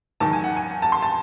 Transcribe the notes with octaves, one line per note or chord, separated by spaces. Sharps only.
E2 D#3 F#3 A5
G#5
F#5
G#5
A5
C6
A5